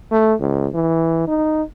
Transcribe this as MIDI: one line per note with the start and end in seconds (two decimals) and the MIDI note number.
0.11 0.34 57
0.40 0.67 37
0.74 1.26 52
1.28 1.62 63